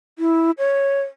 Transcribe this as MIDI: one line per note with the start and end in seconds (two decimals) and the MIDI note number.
0.19 0.51 64
0.58 1.02 73